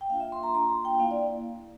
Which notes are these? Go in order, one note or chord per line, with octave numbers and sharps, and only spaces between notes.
G5
A#3 D4 F4 F5
E5
C6
A#5
A#3 D4 F4 C6
A#5
G5
A#3 E4 F5
D5